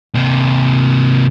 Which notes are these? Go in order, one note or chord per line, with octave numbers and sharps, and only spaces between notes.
C3 A#3